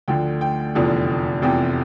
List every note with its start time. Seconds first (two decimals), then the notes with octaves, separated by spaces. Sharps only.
0.08 D2 D3 F3 G5
0.41 G5
0.75 F1 E2 D3 F3
1.42 F1 E2 C3 F3 G5